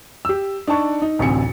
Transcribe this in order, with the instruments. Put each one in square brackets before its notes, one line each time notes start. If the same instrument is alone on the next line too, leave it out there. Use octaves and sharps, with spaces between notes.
[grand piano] G4 E6
D4 D#4 A5 C#6
D#4
A1 D2 C3 C#7